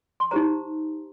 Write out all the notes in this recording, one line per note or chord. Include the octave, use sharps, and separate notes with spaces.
C6
D#4 G4 C5 A#5